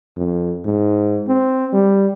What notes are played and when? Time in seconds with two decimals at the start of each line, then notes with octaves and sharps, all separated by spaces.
0.17 F2
0.65 G#2
1.28 C4
1.73 G3